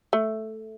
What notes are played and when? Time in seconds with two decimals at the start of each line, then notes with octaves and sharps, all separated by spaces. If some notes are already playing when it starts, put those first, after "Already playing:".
0.13 A3